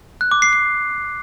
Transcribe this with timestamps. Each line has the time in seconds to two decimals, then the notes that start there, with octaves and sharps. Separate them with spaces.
0.21 F#6
0.31 D6
0.42 C7
0.53 C7